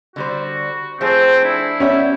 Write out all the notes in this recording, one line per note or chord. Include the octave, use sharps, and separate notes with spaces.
D3 G3 F#4 C5
F3 A3 C4 G#4 C5
D4 E4
G3 B3 C#4 E5